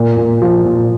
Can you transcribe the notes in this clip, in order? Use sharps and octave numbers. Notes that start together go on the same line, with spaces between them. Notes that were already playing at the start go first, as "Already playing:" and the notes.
Already playing: A#2
A#2
F3
A#2